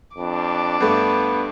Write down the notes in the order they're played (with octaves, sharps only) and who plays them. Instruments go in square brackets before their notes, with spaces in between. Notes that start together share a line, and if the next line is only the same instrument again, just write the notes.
[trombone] F2 [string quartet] D4 D6
[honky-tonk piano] G2 A3 [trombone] B3